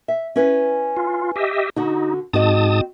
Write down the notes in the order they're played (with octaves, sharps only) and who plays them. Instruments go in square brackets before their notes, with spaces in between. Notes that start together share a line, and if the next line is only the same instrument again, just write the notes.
[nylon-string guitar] E5
C#4 E4 B4
[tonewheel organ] F4
G4 D#5 E5
[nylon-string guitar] D3 F#4 [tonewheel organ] D#4
[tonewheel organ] G#2 A5 D#6 [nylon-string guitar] C4 F#4 D#5